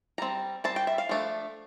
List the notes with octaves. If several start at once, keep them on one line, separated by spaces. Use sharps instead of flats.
G3 C4 A#5
G3 C4 A5
G5
E5
F5
F3 A3 D4